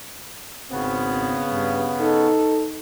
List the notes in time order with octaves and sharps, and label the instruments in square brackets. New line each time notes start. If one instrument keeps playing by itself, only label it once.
[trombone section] G#1 C4 [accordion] C#3 B3
[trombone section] G2
D#4 A4